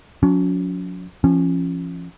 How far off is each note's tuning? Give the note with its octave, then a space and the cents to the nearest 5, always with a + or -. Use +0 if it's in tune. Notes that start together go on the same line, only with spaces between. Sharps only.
F#3 -40 C#4 +35
F3 -25 C#4 -20